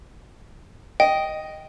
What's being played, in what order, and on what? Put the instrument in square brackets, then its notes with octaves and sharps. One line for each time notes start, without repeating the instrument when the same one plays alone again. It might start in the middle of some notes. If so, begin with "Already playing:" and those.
[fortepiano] D#5 [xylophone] G5